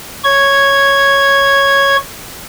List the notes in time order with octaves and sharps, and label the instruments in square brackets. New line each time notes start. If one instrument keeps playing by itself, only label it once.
[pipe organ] C#5 G#6